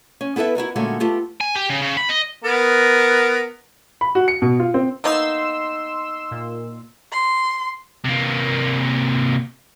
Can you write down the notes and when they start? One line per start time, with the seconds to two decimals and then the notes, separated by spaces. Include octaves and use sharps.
0.21 C#4
0.36 B3 E4 A4 B4 E5
0.55 E4 F#4 A#4 D#5
0.76 A#2 D3 G#3 A3 C#4 F#4
1.00 A3 B3 F4 G4 A4
1.41 G#5
1.56 G4
1.70 C#3
1.82 C#3
1.97 B5
2.09 D#5
2.44 B3 A#4
4.01 B5
4.15 F#4
4.28 C#7
4.42 B2
4.60 F4
4.74 C4
5.04 A#3 B3 D#4 C6 E6
6.31 A#2
7.12 C6
8.05 C3 A#3